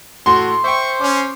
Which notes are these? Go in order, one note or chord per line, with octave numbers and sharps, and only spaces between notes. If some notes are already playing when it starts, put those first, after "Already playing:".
A2 A3 F#4 C6
C5 E5 G5 C#6
C#4 D6